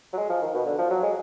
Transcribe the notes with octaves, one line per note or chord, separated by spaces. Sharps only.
F#3
G#3
F3
D#3
B2
D3
F3
F#3
G#3